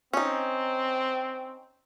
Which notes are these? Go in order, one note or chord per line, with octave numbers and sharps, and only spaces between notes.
C4 C#4 D#4